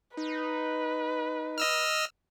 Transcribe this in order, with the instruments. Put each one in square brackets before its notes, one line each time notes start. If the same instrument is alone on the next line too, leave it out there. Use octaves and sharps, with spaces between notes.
[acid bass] D#4 [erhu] B4
[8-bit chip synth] D#5 E6 F6